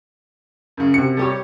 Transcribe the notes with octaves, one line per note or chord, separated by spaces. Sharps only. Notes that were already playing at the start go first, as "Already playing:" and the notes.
F#2 C#3
C3 F#4 C#7
G3 G4 C#5